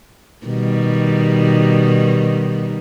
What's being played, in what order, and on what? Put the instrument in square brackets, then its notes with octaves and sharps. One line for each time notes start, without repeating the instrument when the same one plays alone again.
[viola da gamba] B2 D#3 G3